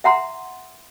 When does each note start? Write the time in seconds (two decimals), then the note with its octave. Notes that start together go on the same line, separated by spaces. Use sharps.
0.04 E5 F#5 A#5 C6